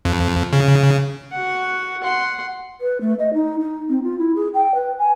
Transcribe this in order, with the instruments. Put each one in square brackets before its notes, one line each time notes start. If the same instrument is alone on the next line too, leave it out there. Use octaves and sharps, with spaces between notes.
[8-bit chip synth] F2
C#3
[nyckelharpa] F#4 F#5
F#5 C6
[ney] B4
A3
D#5
D#4
D#4
C4
F4
E4
G#4
G5
B4
G#5